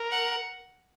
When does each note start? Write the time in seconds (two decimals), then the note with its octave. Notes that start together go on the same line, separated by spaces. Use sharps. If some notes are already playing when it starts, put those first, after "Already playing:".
Already playing: A#4
0.11 F#5